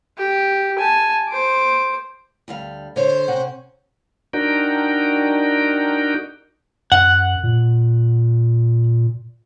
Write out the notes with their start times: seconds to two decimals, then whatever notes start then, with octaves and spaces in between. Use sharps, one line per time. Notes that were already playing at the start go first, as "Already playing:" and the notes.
0.17 G4
0.79 G#5 A5
1.29 C5 D6
2.48 D2 G3 F5
2.96 D3 C5 C#5
3.28 C3 C#4 F#5
4.33 D4 D#4 F#4 A#4 G5
6.92 F#2 F#5
7.43 A#2